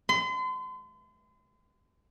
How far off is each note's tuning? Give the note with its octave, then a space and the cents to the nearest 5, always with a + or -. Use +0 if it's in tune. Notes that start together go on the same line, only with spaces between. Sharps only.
C6 -40